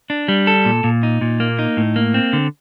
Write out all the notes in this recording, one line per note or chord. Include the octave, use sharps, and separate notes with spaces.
D4
G3
A4
A#2
A#2
D#4
A#2
A#3
D#4
A2
A#3
C4
D3